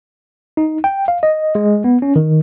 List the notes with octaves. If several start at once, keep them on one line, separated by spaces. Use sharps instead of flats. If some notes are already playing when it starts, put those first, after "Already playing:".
D#4
G5
F5
D#5
G#3
B3
C#4
D#3